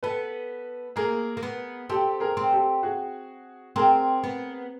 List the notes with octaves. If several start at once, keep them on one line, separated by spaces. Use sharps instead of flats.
B3 A4 B4
A#3 G#4 A#4
A#3
B3
C4 G4 A4
G#4 A#4
C4
G4 A4
F#4 G#4
C4 G#4 A#4
B3